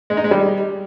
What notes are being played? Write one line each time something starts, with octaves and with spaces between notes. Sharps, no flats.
G#3
D#4
G#3
G3